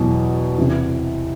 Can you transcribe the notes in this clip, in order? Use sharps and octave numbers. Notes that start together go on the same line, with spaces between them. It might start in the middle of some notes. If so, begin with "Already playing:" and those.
Already playing: E2 B2 F#3
E2 C3 E3